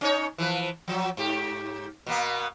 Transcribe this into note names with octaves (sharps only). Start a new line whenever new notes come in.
C#4 D#4 C#5
E3 F3 B4
F3 F#3
G#2 G4
B2 A#3 B3